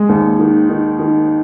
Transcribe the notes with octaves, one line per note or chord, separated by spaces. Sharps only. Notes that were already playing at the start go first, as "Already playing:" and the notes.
Already playing: G#3
D#2
D#3
D#3
D#3